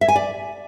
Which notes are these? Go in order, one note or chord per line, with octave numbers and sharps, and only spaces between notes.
E5
G#5
D5